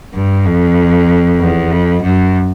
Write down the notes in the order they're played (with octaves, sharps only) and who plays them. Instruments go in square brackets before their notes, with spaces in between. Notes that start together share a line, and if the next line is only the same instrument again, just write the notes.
[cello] G2
F2
E2
F2
F#2